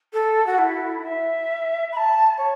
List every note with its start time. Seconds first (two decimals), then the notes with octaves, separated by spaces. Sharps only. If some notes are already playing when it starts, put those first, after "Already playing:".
0.13 A4
0.46 F#4
0.58 E4
1.03 E5
1.92 B5
1.97 A5
2.38 C#5